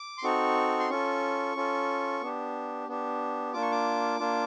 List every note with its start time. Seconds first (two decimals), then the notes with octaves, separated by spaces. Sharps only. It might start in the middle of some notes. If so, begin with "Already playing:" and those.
Already playing: D6
0.18 C6
0.24 C4 D#4 F#4 A4 C#6
0.80 C6
0.90 C#4 F4 A4 C#6
1.55 C#4 F4 A4
2.22 B3 D4 G4
2.88 B3 D4 G4
3.53 A#3 D4 F4 D6
3.62 C#6
3.71 D6
4.19 A#3 D4 F4